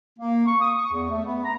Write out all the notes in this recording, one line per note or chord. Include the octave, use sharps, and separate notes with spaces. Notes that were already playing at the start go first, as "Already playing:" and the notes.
A#3
C#6
D#6
C#6
E2
A3
B3
A#5